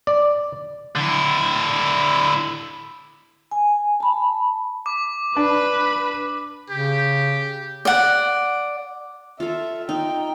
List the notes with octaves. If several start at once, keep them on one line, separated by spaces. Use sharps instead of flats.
D5
D3 E4
G#5
A5 B5
D6
D4 B4 B5
C#3 G4
D5 F#5
F4 A4 E5
D#4 G5